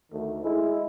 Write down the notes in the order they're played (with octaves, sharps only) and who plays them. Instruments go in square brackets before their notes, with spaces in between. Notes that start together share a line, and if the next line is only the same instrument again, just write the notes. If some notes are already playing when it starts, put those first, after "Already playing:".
[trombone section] D2 D#3 A3
[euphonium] G#3 [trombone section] E4